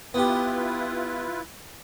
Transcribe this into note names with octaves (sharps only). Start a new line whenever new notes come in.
B3 E4 F4 G4 B4